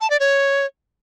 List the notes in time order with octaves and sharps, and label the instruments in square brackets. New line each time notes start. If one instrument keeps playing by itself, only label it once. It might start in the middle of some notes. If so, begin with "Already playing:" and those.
[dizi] A5
D5
C#5